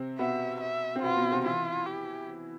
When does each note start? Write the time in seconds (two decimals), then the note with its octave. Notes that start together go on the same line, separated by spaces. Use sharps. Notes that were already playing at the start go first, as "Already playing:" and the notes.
Already playing: C3 C4
0.19 B2 B3 E5
0.61 E5
0.95 C4
1.03 B2 B3 F4
1.17 B2 B3
1.31 C3 C4
1.45 E3 E4 F4
1.87 G4